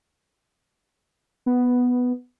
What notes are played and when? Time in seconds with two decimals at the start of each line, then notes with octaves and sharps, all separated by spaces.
1.46 B3